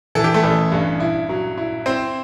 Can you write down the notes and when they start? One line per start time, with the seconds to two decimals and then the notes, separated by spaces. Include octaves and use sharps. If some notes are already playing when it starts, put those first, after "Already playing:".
0.15 E3 A4
0.24 G4
0.34 A3 A4
0.44 A1
0.72 G2
1.00 E4
1.29 F#3
1.58 E4
1.86 C4 E4 C5